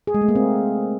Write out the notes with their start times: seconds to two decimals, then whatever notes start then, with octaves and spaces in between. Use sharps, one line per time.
0.07 G#4
0.14 G#3
0.21 A3
0.28 A#3
0.35 C4